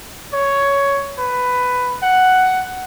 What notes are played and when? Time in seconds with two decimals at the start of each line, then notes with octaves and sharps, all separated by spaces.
0.33 C#5
1.18 B4
2.03 F#5